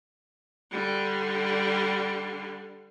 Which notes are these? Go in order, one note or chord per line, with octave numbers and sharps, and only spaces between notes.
D3 G3